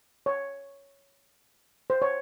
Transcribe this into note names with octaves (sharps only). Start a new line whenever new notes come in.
C#5
C5
C#5